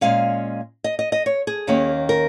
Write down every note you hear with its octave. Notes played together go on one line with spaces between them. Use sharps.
A#2 G#3 C#4 F5
D#5
D#5
D#5
C#5
G#4
D#2 D#3 A#3 C#4
A#4